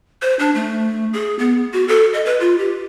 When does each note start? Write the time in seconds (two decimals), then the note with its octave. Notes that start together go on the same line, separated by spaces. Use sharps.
0.22 C5
0.39 D4
0.55 A3
1.14 G#4
1.39 B3
1.73 F#4
1.88 A4
2.13 D#5
2.25 B4
2.40 F4
2.58 G4